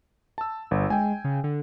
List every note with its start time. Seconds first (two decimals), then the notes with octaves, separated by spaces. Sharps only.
0.38 A5 E6
0.71 G1
0.90 G#3 G5 G#5
1.24 C#3
1.44 D3